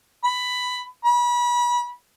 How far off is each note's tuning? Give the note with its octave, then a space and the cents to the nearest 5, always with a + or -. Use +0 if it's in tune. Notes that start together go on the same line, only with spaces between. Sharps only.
B5 +10
B5 -30